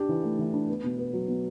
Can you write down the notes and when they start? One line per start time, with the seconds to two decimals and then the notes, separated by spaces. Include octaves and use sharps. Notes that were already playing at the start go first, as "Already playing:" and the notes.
Already playing: D4 G4
0.09 E3
0.23 A3
0.39 E3
0.53 D4
0.69 B3
0.84 B2
0.98 B3
1.13 F#3
1.28 B2